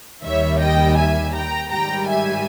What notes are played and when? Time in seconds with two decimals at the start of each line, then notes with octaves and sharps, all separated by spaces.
0.23 D#2 D#3 G3 C#5 E5
0.61 D#5 G5
0.97 E5 G#5
1.34 G5 A#5
1.71 G#2 D#3 G3 G5 A#5
2.07 E5 G#5